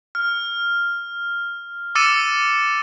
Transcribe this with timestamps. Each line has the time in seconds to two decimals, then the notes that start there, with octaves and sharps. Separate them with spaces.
0.15 F6
1.95 D6 E6 A6 C#7 D#7 E7